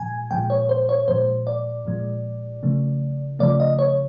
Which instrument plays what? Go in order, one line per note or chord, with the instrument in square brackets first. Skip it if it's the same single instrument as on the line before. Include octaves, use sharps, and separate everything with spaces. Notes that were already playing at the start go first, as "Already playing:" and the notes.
Already playing: [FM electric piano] A#2 F3 G#3 G#5
A#2 F3 G#3 G5
C#5
C5
C#5
A#2 F3 G#3 C5
D5
A#2 F3 G#3
C#3 F3 A3
C#3 F3 A3 D5
D#5
C#5